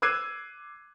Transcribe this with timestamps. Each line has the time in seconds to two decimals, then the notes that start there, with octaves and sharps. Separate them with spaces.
0.02 D6 E6 F#6 G#6 C7 D#7